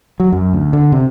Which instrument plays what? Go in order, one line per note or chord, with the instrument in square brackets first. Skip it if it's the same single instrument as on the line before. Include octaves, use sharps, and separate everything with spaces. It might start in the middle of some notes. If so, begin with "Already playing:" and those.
[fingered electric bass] F#3
F#2
D2
D3
C3